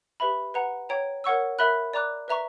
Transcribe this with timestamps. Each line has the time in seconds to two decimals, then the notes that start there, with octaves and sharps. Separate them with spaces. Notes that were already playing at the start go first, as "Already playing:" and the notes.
0.20 G4 B4 E5 B5
0.54 B4 F#5 A#5
0.89 C#5 G5 A#5
1.24 A#4 C#5 F#5 C#6 E6
1.59 A#4 E5 B5 F#6
1.94 D5 A#5 D6 F#6
2.28 B4 E5 A#5 C#6